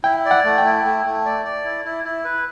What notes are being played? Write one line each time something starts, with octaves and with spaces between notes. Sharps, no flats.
E4 G5
D5
F#5
A3
G5
E4
A3
A3
D5
D5
E4
E4
E4
B4